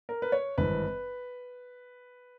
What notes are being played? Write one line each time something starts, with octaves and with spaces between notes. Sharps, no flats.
A#4
B4
C#5
G#1 G2 E3 B4